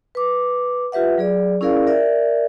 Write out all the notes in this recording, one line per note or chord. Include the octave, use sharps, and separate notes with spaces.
B4 D6
F4 G4 B4 E5 F#5
F#3 G#4 D5
C#4 E4 G#4 A#4 D5 F5
A#4 D5 E5